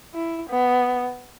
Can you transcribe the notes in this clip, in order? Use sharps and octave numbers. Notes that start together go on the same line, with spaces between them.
E4
B3